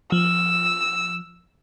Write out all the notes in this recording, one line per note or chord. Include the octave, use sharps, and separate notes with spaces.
F3 E6